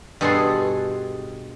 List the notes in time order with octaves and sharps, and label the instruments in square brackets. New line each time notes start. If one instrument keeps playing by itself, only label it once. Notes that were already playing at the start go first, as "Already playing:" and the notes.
[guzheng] G2 B2 G#4 A4 F#5 C6